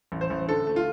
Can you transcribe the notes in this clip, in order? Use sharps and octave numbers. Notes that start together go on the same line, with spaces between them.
A1
C5
A1
D3 A4
A3
F4